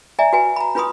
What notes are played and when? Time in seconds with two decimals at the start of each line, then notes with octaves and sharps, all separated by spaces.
0.19 D5 E5 G#5 A#5
0.33 F#4 B4 G#5
0.56 A#5 B5
0.75 D4 F4 B4 B5 C6 D#6